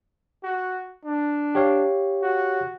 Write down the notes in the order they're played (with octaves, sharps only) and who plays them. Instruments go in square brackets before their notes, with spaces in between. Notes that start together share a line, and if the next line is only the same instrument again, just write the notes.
[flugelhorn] F#4
D4
[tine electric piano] G4 C#5 F5
[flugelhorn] F#4